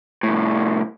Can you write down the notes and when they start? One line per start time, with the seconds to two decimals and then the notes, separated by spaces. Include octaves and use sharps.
0.23 C2 A2